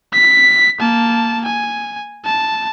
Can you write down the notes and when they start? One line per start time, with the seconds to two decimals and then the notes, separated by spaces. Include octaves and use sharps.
0.13 B6
0.79 A#3 A5
1.45 G#5
2.25 A5